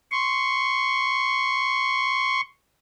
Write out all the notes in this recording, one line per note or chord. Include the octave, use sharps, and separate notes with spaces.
C6 C#6